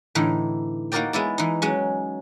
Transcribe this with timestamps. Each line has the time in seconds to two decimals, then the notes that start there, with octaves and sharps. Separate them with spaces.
0.15 A2 D3 E3 D#4
0.92 A#3 D#4 F#4 A#4 D5 G5
1.13 G#3 B3 E4 D5
1.38 E3 D#4
1.62 F#3 G#3 C#4